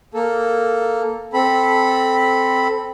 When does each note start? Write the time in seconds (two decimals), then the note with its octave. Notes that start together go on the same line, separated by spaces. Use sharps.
0.14 A#3 A4
1.33 C4 A4 B5